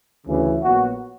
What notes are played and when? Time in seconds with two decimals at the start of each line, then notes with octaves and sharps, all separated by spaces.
0.25 D2 C#3 E3
0.61 A#1 A#2 F#3 B3 F#4